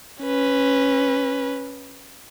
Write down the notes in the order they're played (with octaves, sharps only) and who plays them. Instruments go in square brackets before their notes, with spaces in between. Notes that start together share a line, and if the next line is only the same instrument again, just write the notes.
[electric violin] C#4 B4